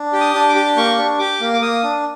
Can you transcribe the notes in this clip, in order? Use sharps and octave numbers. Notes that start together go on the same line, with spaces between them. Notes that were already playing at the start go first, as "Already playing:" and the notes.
Already playing: D4
G4
D#6
D4
D6
G4
A#3 C#6
D4
G4 D6
A#3
D6
A#3 D#6
D4